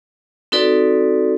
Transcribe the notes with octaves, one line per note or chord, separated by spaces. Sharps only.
C4 D#4 F#4 A4 B4 D5